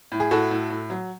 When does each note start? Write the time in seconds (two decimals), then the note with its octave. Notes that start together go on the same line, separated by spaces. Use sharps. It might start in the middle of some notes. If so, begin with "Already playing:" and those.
0.12 A2
0.20 G#4
0.31 A2 F#4 A4
0.51 A2
0.70 A2
0.90 F#3